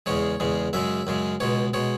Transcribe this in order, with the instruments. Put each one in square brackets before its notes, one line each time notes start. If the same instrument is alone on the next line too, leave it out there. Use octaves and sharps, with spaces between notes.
[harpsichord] E2 C#3 G#3 C#5
E2 C#3 G#3
F#2 C#3 G#3 E5
F#2 C#3 G#3
C#2 B2 G#3 C#5
B2 G#3 C#5